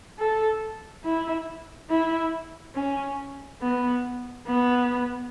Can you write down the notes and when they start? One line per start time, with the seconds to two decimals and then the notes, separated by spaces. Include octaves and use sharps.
0.18 A4
1.05 E4
1.90 E4
2.76 C#4
3.61 B3
4.47 B3